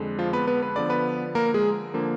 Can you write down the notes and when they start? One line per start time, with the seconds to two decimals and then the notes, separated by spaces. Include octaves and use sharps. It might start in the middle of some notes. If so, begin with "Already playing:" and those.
Already playing: F2 D3 G#3
0.18 F3 F4
0.33 B3 B4
0.47 B3 B4
0.62 B4
0.76 D3 F3 B3 D5
0.89 B3 B4
1.35 A#3 A#4
1.54 G#3 G#4
1.94 D3 F3 A#3